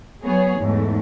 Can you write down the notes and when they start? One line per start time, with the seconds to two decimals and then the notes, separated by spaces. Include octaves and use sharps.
0.24 F#3 B3 G#4 C#5
0.58 E2 G#2 A3